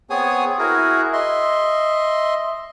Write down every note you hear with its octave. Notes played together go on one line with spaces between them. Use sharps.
B3 C4 G#4 C#5 G#5 D#6
E4 F#4 G#4 A#4
D#5 E5 C6